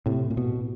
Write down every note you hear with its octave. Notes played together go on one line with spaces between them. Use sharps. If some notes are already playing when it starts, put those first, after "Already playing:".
A2 C3
A#2
B2